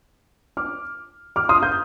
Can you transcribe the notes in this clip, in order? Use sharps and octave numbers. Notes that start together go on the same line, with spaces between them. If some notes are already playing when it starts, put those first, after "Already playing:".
D6 F6
D6 F6
C6 D#6
D#6 G6